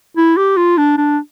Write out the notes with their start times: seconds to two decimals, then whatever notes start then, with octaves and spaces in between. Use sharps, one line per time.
0.17 E4
0.37 G4
0.57 F4
0.77 D4
0.97 D4